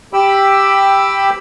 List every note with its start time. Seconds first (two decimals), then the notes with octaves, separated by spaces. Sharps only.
0.13 G4 G5 B5 E6